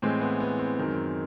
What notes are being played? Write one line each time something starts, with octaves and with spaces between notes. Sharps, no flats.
A2 E3 G#3 C4
B3
B3
C4
F#2 D#3 G#3